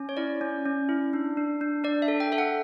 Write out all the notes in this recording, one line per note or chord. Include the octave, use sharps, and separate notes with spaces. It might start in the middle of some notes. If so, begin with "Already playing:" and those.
Already playing: C#4
C#5
E4 D5
C#4
C#4
E4
D4
D4
D4
D4 D5
E5
A4
G5
A4 E5
F#5